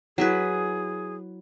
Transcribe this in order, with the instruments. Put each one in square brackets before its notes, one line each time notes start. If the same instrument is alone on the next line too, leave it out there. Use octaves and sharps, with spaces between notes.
[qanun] F#3 E4 B4 [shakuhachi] G#4